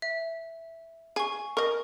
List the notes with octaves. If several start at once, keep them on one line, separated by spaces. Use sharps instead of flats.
E5
G#4 G#5 C#6
A#4 D#5 C#6